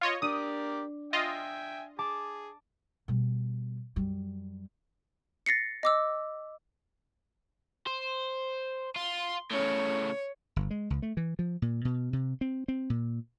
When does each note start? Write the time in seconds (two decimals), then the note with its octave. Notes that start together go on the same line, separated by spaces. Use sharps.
0.01 F4 C#5 D#5
0.22 D4 G4 A#4 D5 D#6
1.13 F4 D#5 E5 G5 G#5
1.99 G#4 A5 D6
3.08 B2 G3
3.96 F#2 G3
5.46 A6 A#6 C7 C#7
5.83 D#5 D6 E6
7.87 C5
8.96 F4 C6
9.51 A2 C#3 C#5
10.56 G1
10.71 G#3
10.90 C#2
11.02 A3
11.17 E3
11.39 F3
11.62 A#2
11.85 B2
12.13 C3
12.41 C4
12.68 C4
12.90 A#2